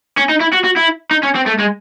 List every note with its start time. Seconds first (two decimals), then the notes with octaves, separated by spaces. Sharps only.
0.18 C#4
0.29 D#4
0.41 E4
0.53 F#4
0.64 F#4
0.77 E4
1.11 D#4
1.23 C#4
1.35 C4
1.46 A3
1.58 G#3